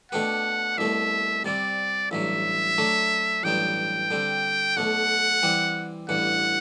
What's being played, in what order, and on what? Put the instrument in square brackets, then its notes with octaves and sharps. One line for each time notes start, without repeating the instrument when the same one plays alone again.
[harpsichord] B2 A3 D4 G4 B4 [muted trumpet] F#5
[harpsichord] C2 B2 A3 [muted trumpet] E5
[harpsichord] C3 G3 C4 [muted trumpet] D5
[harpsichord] A1 G2 F#3 [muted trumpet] E5
[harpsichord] F#3 A3 D4
[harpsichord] A1 G2 F#3 B3 [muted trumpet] G5
[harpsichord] D3 G3 C4
[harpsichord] B1 B2 A3 [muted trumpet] F#5
[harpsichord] E3 G3 C4
[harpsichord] A1 G2 E3 [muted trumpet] F#5